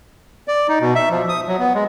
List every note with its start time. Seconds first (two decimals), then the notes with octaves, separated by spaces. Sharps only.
0.48 D5
0.68 D#4
0.81 B2
0.95 E5
1.10 F3
1.29 D#6
1.47 F#3
1.59 B3
1.74 G#3